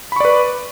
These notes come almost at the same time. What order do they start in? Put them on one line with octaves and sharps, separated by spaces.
B5 C#6 D5 B4